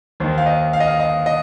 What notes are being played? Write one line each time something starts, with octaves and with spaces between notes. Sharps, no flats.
D#2 D#3 C5
F5
D#5
F5
D#5
F5
D#5
D#5